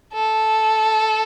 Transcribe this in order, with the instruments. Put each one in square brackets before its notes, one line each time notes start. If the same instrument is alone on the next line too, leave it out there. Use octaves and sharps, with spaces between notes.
[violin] A4